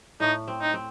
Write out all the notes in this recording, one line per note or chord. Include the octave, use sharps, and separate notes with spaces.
A2 D#4
C4
D#4
C4